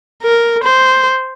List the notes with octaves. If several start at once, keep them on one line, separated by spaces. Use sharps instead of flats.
A#4
C5